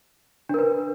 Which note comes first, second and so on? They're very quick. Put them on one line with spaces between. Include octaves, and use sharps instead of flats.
D4 A#4 B4